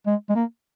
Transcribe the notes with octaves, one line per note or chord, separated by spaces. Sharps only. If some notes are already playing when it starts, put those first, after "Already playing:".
G#3
G#3
A#3